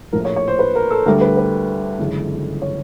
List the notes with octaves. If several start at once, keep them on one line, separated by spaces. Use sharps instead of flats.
A#1 A2 F3 A#4
C#5
C#5
C5
B4
A#4
A4
D2 D3 G3 A#4
B4
B4
G1 F#2 C#3 E3 G#3
C#5